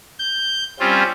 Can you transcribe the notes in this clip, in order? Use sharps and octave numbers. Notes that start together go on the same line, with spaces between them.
G6
G3 C4 C#4 F4